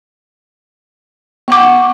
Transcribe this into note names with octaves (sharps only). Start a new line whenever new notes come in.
B3 F#5 C#6 D6